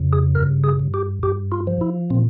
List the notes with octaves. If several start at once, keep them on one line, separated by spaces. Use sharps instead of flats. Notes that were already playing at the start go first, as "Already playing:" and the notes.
Already playing: F2 C#3
G#4
G2 A#4
G#4
G2
G4
G2 G4
F4
F3
E4
A#2 C4